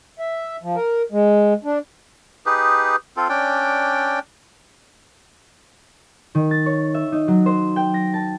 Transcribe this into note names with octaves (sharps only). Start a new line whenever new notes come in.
E5
F3
A#4
G#3
D4
D#4 G4 G#4 B4
C4 F4 A4
C#4 D4 D5 G5
D#3
A6
C#5
E5
D#4
F#3
C5
G5
A#6
A5